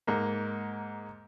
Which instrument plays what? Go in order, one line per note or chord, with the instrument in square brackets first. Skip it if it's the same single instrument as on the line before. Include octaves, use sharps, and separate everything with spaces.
[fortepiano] G#2 A#3